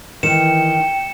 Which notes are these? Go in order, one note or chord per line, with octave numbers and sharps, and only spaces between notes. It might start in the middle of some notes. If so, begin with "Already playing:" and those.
D#3 E3 G5 C#7 E7